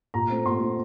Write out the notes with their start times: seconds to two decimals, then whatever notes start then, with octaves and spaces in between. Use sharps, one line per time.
0.14 A#2 A#5
0.30 A3 C4
0.46 A#2 C6
0.61 A3 C4